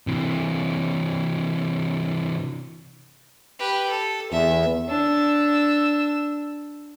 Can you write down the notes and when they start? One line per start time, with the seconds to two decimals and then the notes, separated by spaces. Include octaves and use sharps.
0.07 C3 E3
3.59 G4 B4
3.90 A4
4.31 E2 E5
4.88 D4 E6